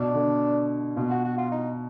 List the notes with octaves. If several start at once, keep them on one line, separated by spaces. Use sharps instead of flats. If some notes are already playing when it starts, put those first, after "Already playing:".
Already playing: B2 D4
D3
B2 F4
F#4
F#4
F4
D#4